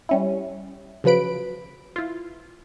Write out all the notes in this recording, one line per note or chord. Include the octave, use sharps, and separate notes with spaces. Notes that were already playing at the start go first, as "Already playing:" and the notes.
G3 C#4 E4
C#3 F3 F#3 B4 B5 D7
E4 F4